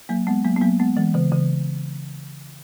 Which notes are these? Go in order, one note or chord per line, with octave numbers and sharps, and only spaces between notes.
F#3 A#3
G#3 B3
F#3 A#3
B3
F#3 A#3
G#3 B3
E3 G#3
C#3 E3
C#3 E3